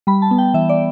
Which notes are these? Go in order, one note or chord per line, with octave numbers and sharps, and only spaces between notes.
G3 B5
A5
B3
G5
E3 E5
D5